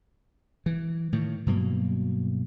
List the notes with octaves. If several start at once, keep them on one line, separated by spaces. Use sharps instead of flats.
E3
A2 D#3
G2 B2 F#3 A#3